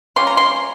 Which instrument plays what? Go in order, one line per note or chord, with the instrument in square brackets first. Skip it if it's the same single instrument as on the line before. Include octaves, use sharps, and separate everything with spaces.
[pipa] G3 A#3 C#4 F4 C6
A#5
C6